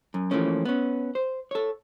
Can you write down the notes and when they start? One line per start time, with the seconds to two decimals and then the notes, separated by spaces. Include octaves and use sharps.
0.14 F#2
0.31 E3 F3 A3 A#3 C#4
0.65 B3 C#4
1.15 C5
1.51 A4 C#5